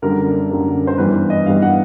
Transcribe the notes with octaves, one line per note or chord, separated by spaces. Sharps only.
F#2 D3 G3 A#3 A#4
F#2 D3 G3 A#3
C5
G2 E3 G3 B3 B4
D#5
G2 E3 G3 B3 F5
F#5